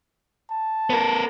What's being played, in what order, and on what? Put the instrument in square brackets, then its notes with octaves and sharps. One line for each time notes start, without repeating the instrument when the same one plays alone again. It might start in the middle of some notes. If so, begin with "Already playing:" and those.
[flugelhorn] A5
[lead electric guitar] B3 A#4